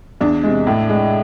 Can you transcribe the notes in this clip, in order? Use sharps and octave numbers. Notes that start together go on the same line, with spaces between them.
E2 D4
C3 G#3
A2
G#3